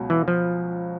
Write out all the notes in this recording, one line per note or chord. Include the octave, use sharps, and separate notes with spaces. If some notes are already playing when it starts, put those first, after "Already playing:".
Already playing: C#2 B2 F#3
E3
F3